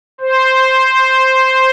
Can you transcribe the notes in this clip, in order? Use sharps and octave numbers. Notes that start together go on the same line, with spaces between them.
C5